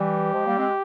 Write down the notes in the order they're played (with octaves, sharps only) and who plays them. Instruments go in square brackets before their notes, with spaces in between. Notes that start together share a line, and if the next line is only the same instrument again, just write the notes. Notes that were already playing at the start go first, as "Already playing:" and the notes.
Already playing: [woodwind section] E3 G3 [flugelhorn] G4
[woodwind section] F3 G#3
G3 A#3
G#3 C4